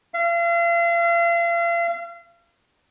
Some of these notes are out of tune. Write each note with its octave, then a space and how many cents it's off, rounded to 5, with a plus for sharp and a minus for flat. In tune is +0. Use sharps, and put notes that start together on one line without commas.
F5 -40